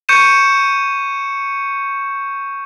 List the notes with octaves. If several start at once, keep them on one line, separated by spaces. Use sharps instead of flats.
C#6 G6 C#7 D#7 E7